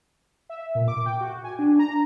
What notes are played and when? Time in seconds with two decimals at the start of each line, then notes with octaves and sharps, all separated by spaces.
0.49 E5
0.75 A#2
0.88 D6
1.06 G5
1.21 F#4
1.44 G#5
1.59 D4
1.79 A#5